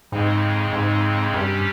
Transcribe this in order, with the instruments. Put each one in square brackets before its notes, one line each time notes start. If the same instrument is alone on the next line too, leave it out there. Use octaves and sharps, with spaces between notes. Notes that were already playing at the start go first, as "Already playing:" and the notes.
[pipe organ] F2 C#3 G#3 C4 D#4 [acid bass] G#2
[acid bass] G#2
[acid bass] G2 [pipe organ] C3 G3 C#4 G4